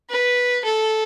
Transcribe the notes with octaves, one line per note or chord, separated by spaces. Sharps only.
B4
A4